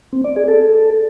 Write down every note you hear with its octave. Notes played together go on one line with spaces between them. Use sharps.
C4
D5
G#4
A4